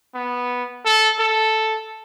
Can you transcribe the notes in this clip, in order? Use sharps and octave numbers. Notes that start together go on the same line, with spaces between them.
B3
A4
A4